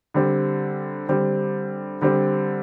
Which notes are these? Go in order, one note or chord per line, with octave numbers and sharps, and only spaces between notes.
D3 G3 C4
D3 G3 C4
D3 G3 C4